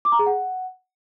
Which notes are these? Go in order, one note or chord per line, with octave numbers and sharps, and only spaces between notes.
D6
A#5
G#4
F#5